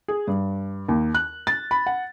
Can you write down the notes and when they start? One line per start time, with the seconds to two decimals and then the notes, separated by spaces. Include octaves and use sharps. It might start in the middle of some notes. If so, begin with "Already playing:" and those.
0.08 G#4
0.27 G2
0.88 D#2
1.15 F#6
1.47 A6
1.71 B5
1.86 F#5